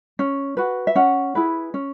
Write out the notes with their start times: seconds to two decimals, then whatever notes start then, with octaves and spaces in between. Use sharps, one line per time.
0.19 C#4
0.57 F#4 B4
0.87 E5
0.95 C#4 F#5
1.35 E4 G#4 B4
1.74 C#4